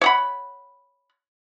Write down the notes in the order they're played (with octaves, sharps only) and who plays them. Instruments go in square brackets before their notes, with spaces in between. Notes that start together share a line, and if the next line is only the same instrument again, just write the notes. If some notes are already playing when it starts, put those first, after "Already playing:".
[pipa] C#5 F#5 B5